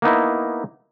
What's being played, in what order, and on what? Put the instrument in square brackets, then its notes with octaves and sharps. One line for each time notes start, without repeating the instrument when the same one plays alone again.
[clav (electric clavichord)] A#3 B3 D#4 E4